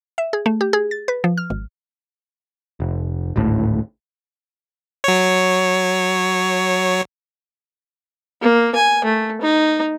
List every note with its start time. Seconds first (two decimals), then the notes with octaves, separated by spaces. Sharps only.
0.18 E5
0.33 G#4
0.46 A3
0.61 G4
0.73 G#4
0.91 A6
1.08 B4
1.24 F3
1.37 F6
1.50 G#1
2.80 F1
3.36 D1 G#1 A2
5.04 F#3 C#5
8.41 A#3
8.75 G#5
9.04 A3
9.41 D#4